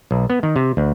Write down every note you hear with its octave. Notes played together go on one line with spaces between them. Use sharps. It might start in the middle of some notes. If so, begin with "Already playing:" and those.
B1
B3
D#3
C3
D2